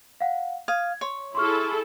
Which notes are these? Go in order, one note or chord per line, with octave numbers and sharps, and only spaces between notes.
F5 F#5
F5 D#6 G#6
C#5 C6
E4 G#4 A4 C6 C#6 F6